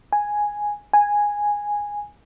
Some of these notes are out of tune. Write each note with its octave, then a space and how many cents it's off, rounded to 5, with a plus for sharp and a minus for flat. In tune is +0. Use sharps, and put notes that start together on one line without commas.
G#5 +0
G#5 -5